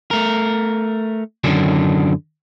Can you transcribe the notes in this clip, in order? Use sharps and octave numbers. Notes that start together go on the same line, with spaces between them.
A3 A#4
F#2 D3 D#3 F#3 D4